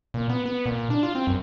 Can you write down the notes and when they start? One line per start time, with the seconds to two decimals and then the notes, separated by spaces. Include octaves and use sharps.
0.14 A#2
0.30 B3
0.46 B3
0.66 A#2
0.78 A#2
0.90 D4
1.03 F4
1.15 C4
1.27 F#2